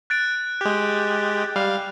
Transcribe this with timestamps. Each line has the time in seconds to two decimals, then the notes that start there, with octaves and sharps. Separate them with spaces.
0.10 F#6 A6 D7
0.61 G#3 G4
1.56 G3 F5